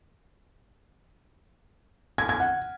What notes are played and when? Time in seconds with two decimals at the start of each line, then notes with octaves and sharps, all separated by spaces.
2.18 G#6
2.29 G#6
2.40 F#5